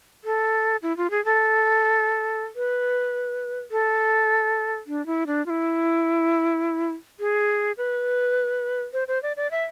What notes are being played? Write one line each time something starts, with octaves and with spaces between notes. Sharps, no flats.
A4
E4
F4
G#4
A4
B4
A4
D4
E4
D4
F4
E4
G#4
B4
C5
C5
D5
D5
E5